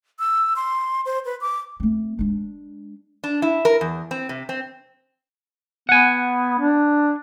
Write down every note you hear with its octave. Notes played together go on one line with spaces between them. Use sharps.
E6
C6
C5
B4
D6
A3 C4
G#3 D4
D4
E4
A#4
E2
C4
C3
C4
B3 F#5 G#5
D4